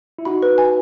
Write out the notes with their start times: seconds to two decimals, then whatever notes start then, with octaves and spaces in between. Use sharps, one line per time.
0.19 E4
0.25 D#4 F#4 B5
0.42 B4
0.58 G#5